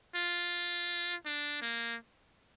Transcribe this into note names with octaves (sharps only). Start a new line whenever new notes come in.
F4
D4
A#3